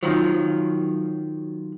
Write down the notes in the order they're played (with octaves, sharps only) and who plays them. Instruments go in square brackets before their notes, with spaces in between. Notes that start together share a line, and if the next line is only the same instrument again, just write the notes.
[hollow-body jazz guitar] D#3 F3 F#3